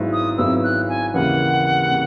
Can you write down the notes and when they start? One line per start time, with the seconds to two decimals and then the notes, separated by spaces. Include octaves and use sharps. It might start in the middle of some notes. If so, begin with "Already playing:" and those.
Already playing: G#1 G#2 F#3 B3 E4
0.13 D#6
0.38 G#1 G#2 F#3 B3 E4 E6
0.64 F#6
0.89 G#5
1.14 D#2 C#3 E3 A#3 F#5
1.91 C#3